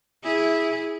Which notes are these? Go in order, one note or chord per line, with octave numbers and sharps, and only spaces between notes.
E4 G#4